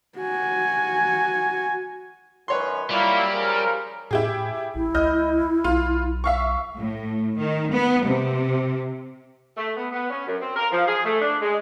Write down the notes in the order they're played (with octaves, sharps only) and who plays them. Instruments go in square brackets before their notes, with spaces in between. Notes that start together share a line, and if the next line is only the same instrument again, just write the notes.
[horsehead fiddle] F#4 G#5
[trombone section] F#2 D#3 [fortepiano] B4 C#5 C6
[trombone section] F#3 E4 [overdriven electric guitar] G3 [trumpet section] A#3 F4
[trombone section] C#3 F3 [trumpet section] A#4
[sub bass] A2 [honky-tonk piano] E4 G4 G#4
[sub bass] A1 [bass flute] E4
[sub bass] C#2 [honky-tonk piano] D#5 F6 G6
[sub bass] B1 [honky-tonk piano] F4
[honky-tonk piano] E5 F5 C#6
[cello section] A2
D#3
B3
C3
[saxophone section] A3
B3
B3
C#4
F#2
C4
A#4
F3
G#4
A3
D4
G#3